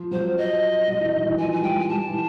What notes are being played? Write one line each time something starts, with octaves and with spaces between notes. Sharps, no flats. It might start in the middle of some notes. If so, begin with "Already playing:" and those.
Already playing: F3
F#3 C5
D#5
F#3
E3
D#3
E3
F3 G#5
G3 G#5
G#3 G5
G#5
G3 A5
E3